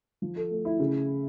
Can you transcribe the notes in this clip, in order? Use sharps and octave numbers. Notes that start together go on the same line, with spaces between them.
F3
A4
A3
E4
C#3